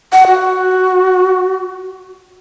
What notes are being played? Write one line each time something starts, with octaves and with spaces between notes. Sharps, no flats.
F#5
F#4